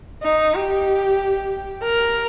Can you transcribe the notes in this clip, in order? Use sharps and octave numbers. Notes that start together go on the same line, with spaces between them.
D#4
G4
A#4